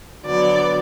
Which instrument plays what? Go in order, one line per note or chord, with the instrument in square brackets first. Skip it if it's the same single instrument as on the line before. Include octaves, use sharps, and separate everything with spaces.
[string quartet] D3 F#3 B3 D5